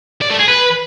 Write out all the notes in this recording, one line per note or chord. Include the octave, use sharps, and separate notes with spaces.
D5
A3
G#4
B4